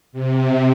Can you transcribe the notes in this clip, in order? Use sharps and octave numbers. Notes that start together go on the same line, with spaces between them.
C3